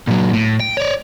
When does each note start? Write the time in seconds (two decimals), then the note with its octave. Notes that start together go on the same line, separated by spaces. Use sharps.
0.07 A#2 F#3
0.33 A2
0.60 G5
0.77 C#5 D5